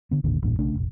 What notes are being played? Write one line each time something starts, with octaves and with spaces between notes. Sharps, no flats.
D3 B3
G#1 D#2 A#2 D3
A1 E2 G2 A#2
B1 C#3 A3 D4
F1 A#1